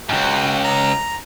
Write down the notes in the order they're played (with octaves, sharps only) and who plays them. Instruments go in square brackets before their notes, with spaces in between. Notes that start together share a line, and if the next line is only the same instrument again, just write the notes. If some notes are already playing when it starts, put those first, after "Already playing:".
[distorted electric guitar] C#2 G#2 [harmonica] F#4 G5
[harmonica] A#5